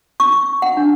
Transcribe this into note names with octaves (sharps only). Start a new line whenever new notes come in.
C#6
F#5
D4